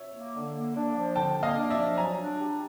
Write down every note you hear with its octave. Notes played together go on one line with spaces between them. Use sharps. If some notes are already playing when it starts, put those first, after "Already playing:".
Already playing: C#5 E5
A#3
D3
A#3
D4
F3
D3 G5 A5
A#3
D#5 F5
D4
D5 E5
F3
F#3 G#5 A#5
D4
G4